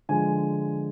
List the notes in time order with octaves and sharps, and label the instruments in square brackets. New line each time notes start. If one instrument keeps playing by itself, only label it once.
[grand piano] D3 F3 G#3 G#5